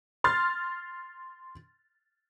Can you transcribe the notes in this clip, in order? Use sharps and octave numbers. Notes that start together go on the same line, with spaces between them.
C6 F6 A6